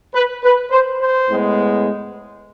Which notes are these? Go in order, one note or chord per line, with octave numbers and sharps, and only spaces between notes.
B4
B4
C5
C5
A2 G#3 B3